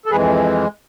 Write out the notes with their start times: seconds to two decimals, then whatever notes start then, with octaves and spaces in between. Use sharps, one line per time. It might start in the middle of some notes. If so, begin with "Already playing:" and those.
0.06 A4
0.10 F2 E3 G#3 G#4 B4